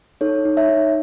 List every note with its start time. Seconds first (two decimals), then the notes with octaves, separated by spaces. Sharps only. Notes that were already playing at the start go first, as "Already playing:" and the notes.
0.21 D#4 A4 C#5
0.45 D#4
0.57 C#5 E5
0.69 D#4